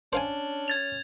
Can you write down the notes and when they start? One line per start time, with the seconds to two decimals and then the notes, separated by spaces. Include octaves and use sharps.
0.13 C#4 D4 C5 F5 G#5
0.68 G#6 A6 F7